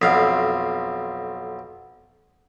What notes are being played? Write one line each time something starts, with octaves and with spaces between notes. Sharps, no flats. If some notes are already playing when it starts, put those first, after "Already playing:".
B1 F2 F5